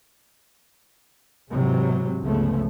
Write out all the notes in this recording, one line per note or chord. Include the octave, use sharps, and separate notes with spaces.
G#2 C3 E3 F#3
G1 C#2 C#3 F3 A3 B3